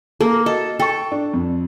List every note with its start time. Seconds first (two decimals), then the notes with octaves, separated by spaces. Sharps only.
0.21 A#3 A4
0.46 F#4 A4 D#5
0.80 A4 G5 C#6
1.12 D4
1.33 F2